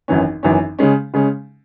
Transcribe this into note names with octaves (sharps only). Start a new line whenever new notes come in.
G#1 F#2 E3 C#4
G#1 F#2 E3 C#4
C#3 G#3 C#4
C#3 G#3 C#4